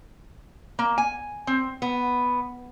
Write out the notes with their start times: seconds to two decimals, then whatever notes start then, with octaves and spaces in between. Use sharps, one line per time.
0.79 A#3
0.98 G#5
1.47 C4
1.82 B3